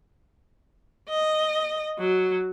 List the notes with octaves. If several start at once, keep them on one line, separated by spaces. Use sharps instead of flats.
D#5
F#3